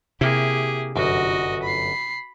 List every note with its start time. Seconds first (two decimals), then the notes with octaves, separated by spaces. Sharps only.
0.21 C3 A#3 E4 G4 G#4
0.96 G1 F#2 F#4 D#5
1.63 B5 C7